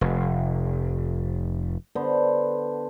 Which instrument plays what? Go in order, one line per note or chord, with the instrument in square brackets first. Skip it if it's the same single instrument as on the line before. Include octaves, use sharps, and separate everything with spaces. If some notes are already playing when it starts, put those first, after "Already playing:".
[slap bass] F1
[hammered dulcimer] D3 B3 C5